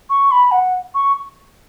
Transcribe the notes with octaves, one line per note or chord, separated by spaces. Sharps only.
C#6
B5
F#5
C#6